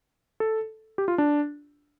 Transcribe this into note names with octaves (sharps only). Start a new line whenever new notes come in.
A4
G4
F4
D4